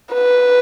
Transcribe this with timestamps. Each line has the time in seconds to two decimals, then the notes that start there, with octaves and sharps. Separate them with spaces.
0.14 B4